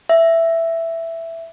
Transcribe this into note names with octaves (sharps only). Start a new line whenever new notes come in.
E5